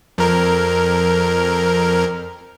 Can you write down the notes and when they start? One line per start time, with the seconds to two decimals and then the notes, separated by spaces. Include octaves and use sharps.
0.18 F2 A#4